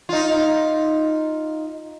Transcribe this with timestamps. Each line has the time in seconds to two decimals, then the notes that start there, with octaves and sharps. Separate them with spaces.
0.09 D#4 F4